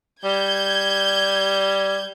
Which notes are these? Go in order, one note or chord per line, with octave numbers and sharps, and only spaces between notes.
G3 G6 G#6